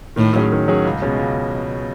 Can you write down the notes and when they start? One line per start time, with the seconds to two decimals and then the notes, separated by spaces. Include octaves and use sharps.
0.16 A2 D#3
0.33 F#3 C#4 G#4
0.52 D#3
0.68 F#3 C#4 G#4
0.85 C#2
1.02 B2 G#3 C#4
1.19 C#2